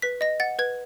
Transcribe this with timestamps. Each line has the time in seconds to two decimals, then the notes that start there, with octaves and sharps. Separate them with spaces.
0.02 B4 B6
0.21 D#5 A#6
0.40 F#5 A6
0.59 B4 G#6